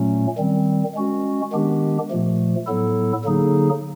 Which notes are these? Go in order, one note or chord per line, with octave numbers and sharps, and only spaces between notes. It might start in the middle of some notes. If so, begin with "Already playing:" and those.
Already playing: A#2 F#3 A3 C#4
D#3 G3 C4
G#3 C#4 F#4
D#3 G#3 B3 D4 G4
A#2 F3 A3
A2 F#3 B3 E4 A4
D3 F#3 A#3 D#4 G#4